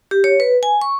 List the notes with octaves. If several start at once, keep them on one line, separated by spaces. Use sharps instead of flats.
G4
C#5
B4
G#5
C#6